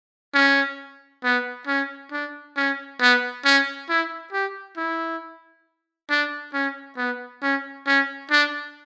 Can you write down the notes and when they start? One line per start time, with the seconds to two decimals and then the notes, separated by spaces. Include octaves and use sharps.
0.34 C#4
1.24 B3
1.67 C#4
2.12 D4
2.57 C#4
3.01 B3
3.45 C#4
3.89 E4
4.33 G4
4.77 E4
6.10 D4
6.54 C#4
6.97 B3
7.42 C#4
7.87 C#4
8.31 D4